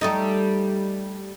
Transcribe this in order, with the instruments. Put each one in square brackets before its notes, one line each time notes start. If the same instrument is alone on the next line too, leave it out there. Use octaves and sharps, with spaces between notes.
[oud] G3 A3 D#4